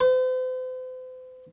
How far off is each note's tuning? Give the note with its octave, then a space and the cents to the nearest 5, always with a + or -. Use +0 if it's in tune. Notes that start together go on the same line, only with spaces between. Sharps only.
C5 -40